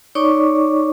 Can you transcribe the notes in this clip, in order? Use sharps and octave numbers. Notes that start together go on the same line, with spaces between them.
D#4 C#5 D5 C#6 D6